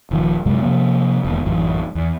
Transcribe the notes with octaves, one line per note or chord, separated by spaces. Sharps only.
D#1 D#3 F3
F#2 C3 F#3 G#3
C3 F3 A#3
E1 D#2
A1 F#2 E3
E2